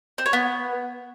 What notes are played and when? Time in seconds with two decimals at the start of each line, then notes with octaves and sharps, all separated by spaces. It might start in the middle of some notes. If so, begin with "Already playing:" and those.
0.18 C4
0.26 C#5
0.33 B3